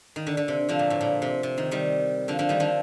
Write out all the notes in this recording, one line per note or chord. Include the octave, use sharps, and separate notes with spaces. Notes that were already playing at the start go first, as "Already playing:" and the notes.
D#3
D3
D3
C3
D3 F3
A#2
A2
A#2
C3
C3
D#3
D#3 G3
D3 F3
D3 F3
D#3 G3
D3 F3